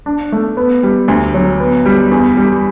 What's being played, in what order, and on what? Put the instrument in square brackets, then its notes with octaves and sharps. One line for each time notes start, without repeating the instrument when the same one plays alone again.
[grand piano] D4
A3
B3
G3
D2
F#3
B3
G3
E2
G3